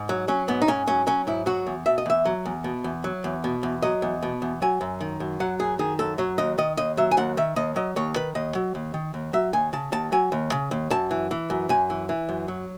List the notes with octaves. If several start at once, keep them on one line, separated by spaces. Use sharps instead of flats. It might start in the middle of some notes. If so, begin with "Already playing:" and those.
Already playing: G#2
F#3
F#3 C#4
G#2 B3
D#4
G#2 C#4
F#3 C#4
F#3 C#4
G#2 E4
F#3 F#4
E2
B2 E5
D#5
E2 E5
F#3
E2
B2
E2
F#3
E2
B2
E2
F#3 D#5
E2
B2
E2
F#3 G#5
F#2
D#3
F#2
F#3 F#5
F#2 G#4
D#3 G#4
F#2 A4
F#3 C#5
D#2 D#5
D#3 D#5
D#2 D#5
F#3 E5
G#5
D#2 F#5
D#3 E5
D#2 D#5
F#3 D#5
D#2 C#5
D#3 B4
D#2 D#5
F#3
D#2
D#3
D#2
F#3 E5
D#2 G#5
C#3 A5
D#2 A5
F#3 G#5
D#2
C#3
D#2
F#2 A5
E3
E3
F#2
F#2 G#5
E3
E3
F#2
F#3